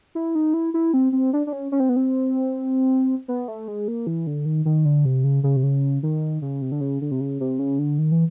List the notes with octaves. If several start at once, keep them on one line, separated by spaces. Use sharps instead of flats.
E4
D#4
E4
E4
C4
C4
D4
D4
C#4
C#4
C4
B3
C4
B3
A3
G#3
A#3
E3
D3
D#3
D#3
D3
C3
C#3
C#3
C3
C#3
D#3
C#3
C3
D3
C#3
D3
C3
C#3
C3
C#3
D3
D#3
E3